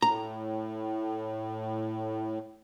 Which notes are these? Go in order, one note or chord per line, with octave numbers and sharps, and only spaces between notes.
A2 A#5